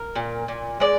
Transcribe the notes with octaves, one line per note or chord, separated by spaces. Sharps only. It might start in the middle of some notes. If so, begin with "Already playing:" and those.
Already playing: A#4
A#2
A#2
G#3 D5